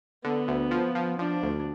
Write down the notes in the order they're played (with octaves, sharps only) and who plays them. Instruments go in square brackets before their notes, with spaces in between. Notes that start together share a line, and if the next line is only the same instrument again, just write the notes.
[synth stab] D3 [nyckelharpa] B3
[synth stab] D2
F3
F3
[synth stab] F3 [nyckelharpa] D4
[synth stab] D2